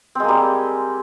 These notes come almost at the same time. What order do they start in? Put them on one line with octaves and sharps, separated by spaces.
C4 G#3 A#3 G3